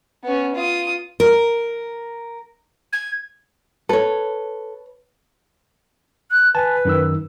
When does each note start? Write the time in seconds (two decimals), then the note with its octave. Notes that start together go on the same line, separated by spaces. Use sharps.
0.24 B3 C#4
0.55 F4 D#6
1.20 A#4
2.93 G#6
3.89 A4 B4 C#5
6.32 F#6
6.55 B4 G#5 A5
6.85 F#2 D#3 E6